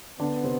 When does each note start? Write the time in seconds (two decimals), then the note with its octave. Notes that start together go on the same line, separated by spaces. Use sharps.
0.19 D3 B3 D4
0.44 C3 C4